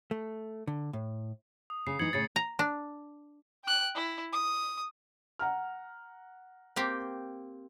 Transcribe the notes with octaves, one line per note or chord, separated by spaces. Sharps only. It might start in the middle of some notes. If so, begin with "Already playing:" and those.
A3
D3
A2
D#6
C#3 C7
E3 D#4 G#6 C#7 F#7
A2 C#3 A6 C7 C#7
A#5
D4
G5 F#6
E4
D#6
F#5 A#5 F6
A#3 C4 G4